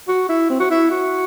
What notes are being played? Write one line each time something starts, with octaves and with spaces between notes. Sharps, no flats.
F#4
E4
C4
F#4
E4
F#4